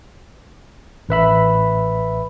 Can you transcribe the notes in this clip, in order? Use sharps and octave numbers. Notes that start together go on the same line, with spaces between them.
A1 B4 E5 B5